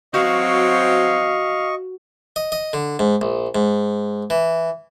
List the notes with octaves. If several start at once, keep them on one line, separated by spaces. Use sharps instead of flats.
F#3 C4 F#4 D#5 F5 C#6
D#5
D#5
D3
G#2
A#1
G#2
E3